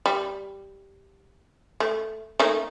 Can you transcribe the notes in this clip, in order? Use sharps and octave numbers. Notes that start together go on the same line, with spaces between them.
G3
A3
A3 A#3 D#4